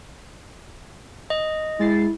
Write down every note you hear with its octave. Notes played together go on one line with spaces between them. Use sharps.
D#5
G#3 E4 A6 C7